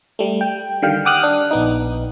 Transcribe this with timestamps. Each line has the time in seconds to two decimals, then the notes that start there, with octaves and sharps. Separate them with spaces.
0.19 G3 A3
0.41 G5
0.82 D3 D#3 G3 F5 G5
1.05 F#5 G5 D6 D#6 F6 F#6
1.23 D4
1.51 A#1 B3 D#4